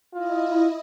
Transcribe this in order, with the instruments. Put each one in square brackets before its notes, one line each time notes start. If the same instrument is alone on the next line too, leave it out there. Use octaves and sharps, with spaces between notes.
[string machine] E4 D#5 [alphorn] F4